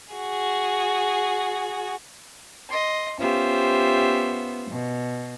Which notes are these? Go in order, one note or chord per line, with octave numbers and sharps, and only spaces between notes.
F#4 G#4
D#5 C6
B3 C#4 F4 G4 C5 E5
B2